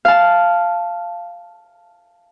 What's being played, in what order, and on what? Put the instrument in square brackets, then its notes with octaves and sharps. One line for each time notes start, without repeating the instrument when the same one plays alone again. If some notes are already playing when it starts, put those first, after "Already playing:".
[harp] F5 A5